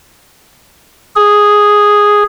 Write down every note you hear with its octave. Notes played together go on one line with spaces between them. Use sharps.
G#4